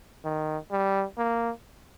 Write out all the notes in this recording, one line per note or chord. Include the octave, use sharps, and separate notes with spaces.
D#3
G3
A#3